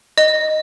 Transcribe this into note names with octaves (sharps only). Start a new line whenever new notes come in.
D#5